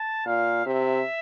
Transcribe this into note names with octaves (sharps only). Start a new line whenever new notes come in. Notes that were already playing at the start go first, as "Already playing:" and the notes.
Already playing: A5
A#2 F5
C3 E5